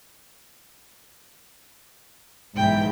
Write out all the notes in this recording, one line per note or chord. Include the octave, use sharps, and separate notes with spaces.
B1 G#2 E3 G5